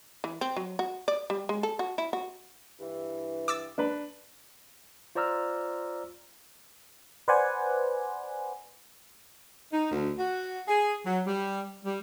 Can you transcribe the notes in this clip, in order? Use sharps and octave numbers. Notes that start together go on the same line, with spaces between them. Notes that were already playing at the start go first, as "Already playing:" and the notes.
E3
C4
F#3
F#4
D5
G3
G#3
A4
F#4
E4
F#4
G2 E3
D6 E6 A6
D4 B4
F4 C5 D5 A#5 E6 F6
B4 C5 D5 F#5 G#5
D#4
D2
F#4
G#4
F#3
G3
G3